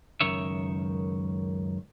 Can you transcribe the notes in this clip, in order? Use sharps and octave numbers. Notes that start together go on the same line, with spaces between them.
C#2 F#2 D#3 C#5 E5